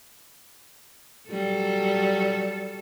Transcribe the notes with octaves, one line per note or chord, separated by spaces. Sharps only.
F#3 G3 A4